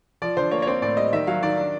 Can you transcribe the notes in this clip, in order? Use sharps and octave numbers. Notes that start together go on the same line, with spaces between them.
F3 D5
D3 C5
A#3 C#5
C#5
C4 D5
A2 D5
G3 D#5
D#3 E5
F#3 F5
D#3 D5
D4